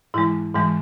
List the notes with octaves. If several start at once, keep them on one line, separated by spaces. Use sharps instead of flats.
G#2 E3 G#3 E4
G#2 E3 G#3